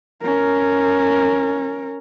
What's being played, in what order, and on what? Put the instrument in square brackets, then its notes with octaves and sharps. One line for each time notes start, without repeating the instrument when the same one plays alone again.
[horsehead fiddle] C#4 A#4